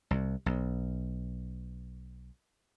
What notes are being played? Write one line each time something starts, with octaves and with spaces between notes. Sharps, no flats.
C2
B1